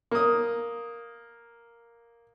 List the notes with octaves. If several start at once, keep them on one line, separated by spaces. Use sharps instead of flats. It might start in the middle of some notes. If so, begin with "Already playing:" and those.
A#3 D#6